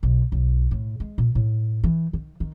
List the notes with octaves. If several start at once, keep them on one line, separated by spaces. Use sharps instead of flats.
B1
B1
A2
G#3
A#2
A2
E3
D#3
D#3